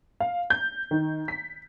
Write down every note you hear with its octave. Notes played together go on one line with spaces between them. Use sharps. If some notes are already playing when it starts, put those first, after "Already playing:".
F5
G6
D#3
B6